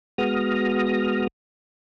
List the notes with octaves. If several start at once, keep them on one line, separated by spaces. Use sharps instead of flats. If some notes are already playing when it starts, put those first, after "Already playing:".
G#3 B3 F#4 D#6 F6 A#6